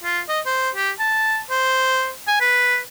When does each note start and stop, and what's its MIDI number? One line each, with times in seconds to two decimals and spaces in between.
0.04 0.20 65
0.29 0.40 75
0.46 0.70 72
0.75 0.91 67
0.99 1.40 81
1.50 2.10 72
2.28 2.36 80
2.40 2.78 71